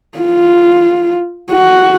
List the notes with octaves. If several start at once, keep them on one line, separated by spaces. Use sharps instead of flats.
F4
F#4